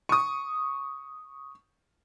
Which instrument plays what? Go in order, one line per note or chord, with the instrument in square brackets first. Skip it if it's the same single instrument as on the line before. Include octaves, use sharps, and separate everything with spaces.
[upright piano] C#6 D#6